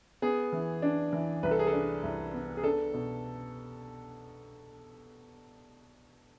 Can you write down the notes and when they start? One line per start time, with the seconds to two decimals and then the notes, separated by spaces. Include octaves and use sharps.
0.22 B3 G#4
0.53 E3
0.82 D4
1.13 E3
1.43 C2 B4
1.51 A4
1.59 G#4
1.67 A4
1.73 D4
2.03 C2
2.33 B3
2.57 G#4
2.64 D4 A4
2.94 B2